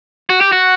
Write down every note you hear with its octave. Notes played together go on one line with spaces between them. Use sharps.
F#4
G4
F#4